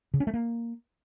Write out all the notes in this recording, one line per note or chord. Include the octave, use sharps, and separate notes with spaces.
C#3
C#4
A3
A#3